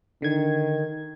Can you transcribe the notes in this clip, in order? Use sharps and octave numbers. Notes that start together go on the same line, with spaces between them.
D3 D#3 G#6